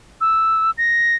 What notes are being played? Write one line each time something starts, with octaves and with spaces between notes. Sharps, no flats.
E6
A#6